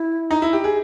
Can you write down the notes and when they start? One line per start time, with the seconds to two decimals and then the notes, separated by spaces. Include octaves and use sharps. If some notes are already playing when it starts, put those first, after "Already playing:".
Already playing: E4
0.31 D#4
0.42 E4
0.53 G4
0.64 G#4